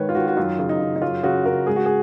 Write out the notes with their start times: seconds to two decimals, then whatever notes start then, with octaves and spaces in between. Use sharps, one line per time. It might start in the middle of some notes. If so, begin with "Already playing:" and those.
Already playing: G#2 D#3 B4 C#5
0.09 F4
0.15 D#3 F#4
0.28 F#4
0.37 F#2 F4
0.59 C#3
0.69 D#4
0.80 C#3
0.96 D#4
1.02 F#2 F4
1.23 C#3 F#4
1.45 C#3 A#4
1.66 G#2 G#4
1.76 F#4
1.86 G#4